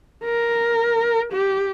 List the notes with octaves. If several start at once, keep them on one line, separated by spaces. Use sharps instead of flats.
A#4
G4